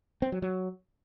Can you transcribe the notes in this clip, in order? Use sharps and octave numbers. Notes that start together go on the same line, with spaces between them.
C4
F#3
F#3